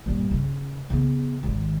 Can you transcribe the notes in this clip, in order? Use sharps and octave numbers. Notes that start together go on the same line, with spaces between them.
G2 A#2
C#3
C#3 B3
G#1 D#3